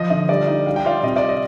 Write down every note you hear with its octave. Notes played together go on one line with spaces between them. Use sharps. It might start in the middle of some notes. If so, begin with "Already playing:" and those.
Already playing: F3 D#5
D3 D#5
G3 D5
D#4 D#5
G3 F5
G5
F4 D5 F5
C3 D#5
D5
D#5